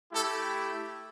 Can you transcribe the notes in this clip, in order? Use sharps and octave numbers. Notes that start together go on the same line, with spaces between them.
A3 E4 G4 A4